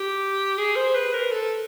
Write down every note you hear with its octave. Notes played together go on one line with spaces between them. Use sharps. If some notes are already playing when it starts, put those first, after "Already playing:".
Already playing: G4
G#4
C5
B4
A#4
A4